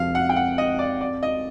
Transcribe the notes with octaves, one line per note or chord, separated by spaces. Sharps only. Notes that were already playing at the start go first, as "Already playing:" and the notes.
Already playing: F2 C3 F3 F5
F#5
G5
F#5
D#5
D5
D5
D#5